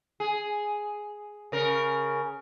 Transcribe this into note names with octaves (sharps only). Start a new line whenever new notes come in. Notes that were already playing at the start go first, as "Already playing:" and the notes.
G#4
C#3 A#4